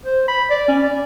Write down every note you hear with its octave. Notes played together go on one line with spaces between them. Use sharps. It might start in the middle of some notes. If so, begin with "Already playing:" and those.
C5
B5
D5
C#4
D5